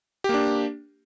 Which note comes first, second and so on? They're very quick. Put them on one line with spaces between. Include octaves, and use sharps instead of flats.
G4 A#3 D4